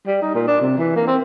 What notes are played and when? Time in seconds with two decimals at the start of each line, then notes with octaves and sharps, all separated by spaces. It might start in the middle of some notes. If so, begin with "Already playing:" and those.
0.07 G3
0.22 D#4
0.35 A#2
0.47 D4
0.61 C3
0.78 E3
0.96 A#3
1.07 C4